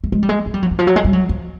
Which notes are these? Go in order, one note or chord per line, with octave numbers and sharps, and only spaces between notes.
A3
G#3
G3
G#3
G#3
G3
F#3
E3
F3
F#3
G#3
G3
F#3
F3